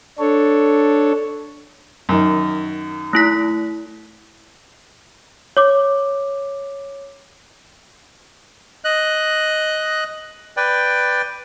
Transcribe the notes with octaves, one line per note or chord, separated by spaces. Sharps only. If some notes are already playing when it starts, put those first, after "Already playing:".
D4 A4 C#5
F#2 D#3
A3 E4 B6
C#5 D6
D#5 F#6
B4 D5 G5